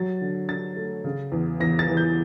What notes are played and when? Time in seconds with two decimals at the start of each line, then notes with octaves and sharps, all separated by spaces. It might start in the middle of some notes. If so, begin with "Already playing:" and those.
Already playing: F#3 A6
0.21 D3
0.49 D3 A6
0.76 A3
1.05 C#3
1.32 E2
1.60 E2 A#6
1.79 A6
1.88 E3
1.97 G6